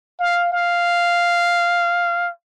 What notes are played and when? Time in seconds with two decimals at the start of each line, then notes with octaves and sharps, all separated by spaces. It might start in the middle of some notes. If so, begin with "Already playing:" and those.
0.20 F5
0.52 F5